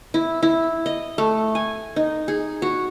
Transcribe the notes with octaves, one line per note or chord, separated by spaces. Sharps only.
E4
E4
D#5
A3
G#5
D#4
G#4
F#4